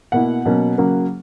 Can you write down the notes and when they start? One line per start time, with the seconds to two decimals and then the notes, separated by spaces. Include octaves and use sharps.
0.12 B2 A#3 E4 F#5
0.45 B2 F#3 A#3 C#4
0.78 C#3 F#3 A#3